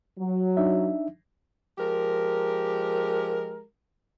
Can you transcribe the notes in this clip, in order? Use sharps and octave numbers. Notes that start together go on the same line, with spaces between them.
F#3
D4 D#4 E5
F3 G#3 G4 A#4